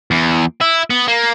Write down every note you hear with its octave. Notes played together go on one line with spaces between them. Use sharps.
E2
E4
B3
A#3